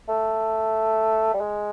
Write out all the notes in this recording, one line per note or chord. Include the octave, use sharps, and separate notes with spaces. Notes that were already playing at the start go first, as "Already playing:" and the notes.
A3
G3
G#3